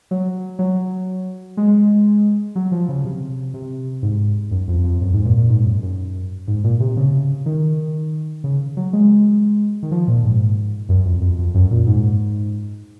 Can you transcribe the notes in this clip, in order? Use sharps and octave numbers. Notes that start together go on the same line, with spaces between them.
F#3
F#3
G#3
F#3
F3
C#3
C3
C3
G#2
F#2
F2
F2
F#2
G#2
A#2
A#2
G#2
F#2
F#2
G#2
A#2
C3
C#3
D#3
C#3
F#3
G#3
D#3
F3
A#2
G#2
F#2
F2
F2
F2
F#2
A#2
G#2